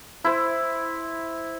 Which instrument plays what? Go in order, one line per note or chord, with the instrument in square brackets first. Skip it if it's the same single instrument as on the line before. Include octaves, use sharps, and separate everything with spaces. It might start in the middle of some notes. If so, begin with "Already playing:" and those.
[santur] E4 C5